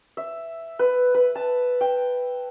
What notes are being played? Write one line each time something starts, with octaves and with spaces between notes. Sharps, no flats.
E5
B4
B4
A5
G5